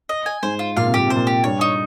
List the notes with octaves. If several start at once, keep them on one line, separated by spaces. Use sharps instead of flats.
D#5
G#5
G#2 C5
F4
A#2 F5
C3
A#2 G4
C3 C5
A#2
G4
G2 C#5
D#4